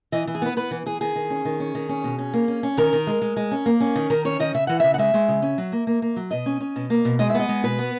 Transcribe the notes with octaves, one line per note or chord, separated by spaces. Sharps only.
E3 D#5
E3
G#4
B3 B4
B3 B4
E3
E3 G#4
D#3 G#4
D#3
C#4
D#3
C#4
D#3
C#4
B2
C#4
A#3
C#4
C#4
D#3 A#4
D#3
G#3
G#3
G#3
C#4
A#3
C#4
D#3
D#3 A#4
C#4 C#5
D#3 D#5
C#3 E5
E3 F#5
C#3 E5
F#5
G#3 E5
G#3
C#3
C#4
F#3
A#3
A#3
A#3
F#3
B2 D#5
C#4
C#4
B2
A#3
B2
G#3 D#5
E5
B3 D#5
G#3
B2 B4
B3